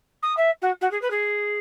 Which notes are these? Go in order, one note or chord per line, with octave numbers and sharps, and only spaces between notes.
D#6
E5
F#4
F#4
G#4
B4
G#4